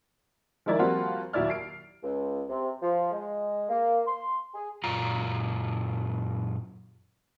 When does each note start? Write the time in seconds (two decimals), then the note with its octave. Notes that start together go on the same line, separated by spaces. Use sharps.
0.66 D#3 F3 G#3 E4 A#4 D5
0.79 F3 G3 A#3 C4 F4 F#4
1.33 D#2 F#3 E4 D5 F6
1.50 C7 D7
2.03 C#2
2.49 C3
2.82 F3
3.12 G#3
3.69 A#3
4.07 C6
4.55 G#4
4.84 F#2 A#2 F#3 F4 A#5